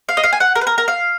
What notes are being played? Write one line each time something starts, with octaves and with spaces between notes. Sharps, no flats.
F5
D#5
F5
G#5
F#5
A#4
B4
A#4
A#4
F5